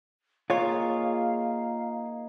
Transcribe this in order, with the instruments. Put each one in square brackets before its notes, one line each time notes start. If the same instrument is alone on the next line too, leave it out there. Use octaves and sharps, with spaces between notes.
[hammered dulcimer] A#3 D#4 G#4 [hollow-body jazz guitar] F4 C#5 [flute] F5